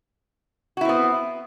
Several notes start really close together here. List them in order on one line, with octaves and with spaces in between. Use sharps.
F#4 E4 C4 B3